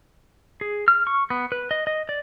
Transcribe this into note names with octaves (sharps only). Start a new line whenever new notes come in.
G#4
F6
C#6
B3
B4
D#5
D#5
D5